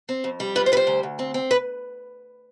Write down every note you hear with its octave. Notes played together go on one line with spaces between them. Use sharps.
C4
F2
G3
F4 B4
C5
G3 B4
C5
D2
D2
C4
C4
B4